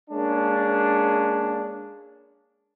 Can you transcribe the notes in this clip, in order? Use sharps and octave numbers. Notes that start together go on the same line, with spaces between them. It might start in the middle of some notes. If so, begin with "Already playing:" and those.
G#3 A#3 C#4 D4